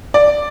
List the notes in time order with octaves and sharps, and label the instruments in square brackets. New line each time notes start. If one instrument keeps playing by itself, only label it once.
[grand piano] D5